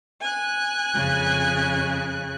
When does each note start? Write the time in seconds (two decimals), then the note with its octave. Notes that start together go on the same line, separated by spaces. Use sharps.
0.22 G#5 F#6
0.95 F2 C#3